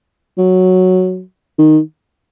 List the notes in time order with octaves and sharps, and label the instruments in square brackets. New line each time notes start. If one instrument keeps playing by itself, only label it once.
[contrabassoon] F#3
D#3